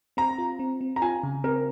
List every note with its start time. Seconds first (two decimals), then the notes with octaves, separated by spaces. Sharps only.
0.17 C4 A#5
0.38 F4
0.59 C4
0.81 C4
0.96 A#5
1.02 F4 G#5
1.23 C#3
1.44 C4 A#4